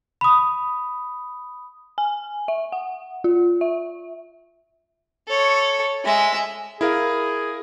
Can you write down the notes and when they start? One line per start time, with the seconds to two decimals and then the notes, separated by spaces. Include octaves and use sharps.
0.21 B5 D#6
1.98 G#5
2.48 E5
2.72 F#5
3.24 F4
3.61 E5
5.28 A4 C#5
6.04 G#3 E5
6.81 E4 G#4 A#4 F5